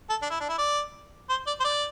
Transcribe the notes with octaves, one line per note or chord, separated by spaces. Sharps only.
A4
D4
E4
D4
E4
D5
C5
D5
C5
D5